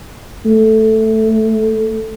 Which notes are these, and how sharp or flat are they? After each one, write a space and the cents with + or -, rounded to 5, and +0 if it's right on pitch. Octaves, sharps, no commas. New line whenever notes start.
A3 +0